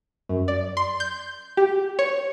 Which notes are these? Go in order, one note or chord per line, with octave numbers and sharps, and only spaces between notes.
F#2
D5
C6
G6
G4
C#5